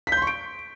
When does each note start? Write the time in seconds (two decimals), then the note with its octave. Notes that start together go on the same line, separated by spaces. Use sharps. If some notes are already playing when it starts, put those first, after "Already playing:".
0.07 B6
0.12 G6
0.17 C6
0.22 C#6
0.27 D7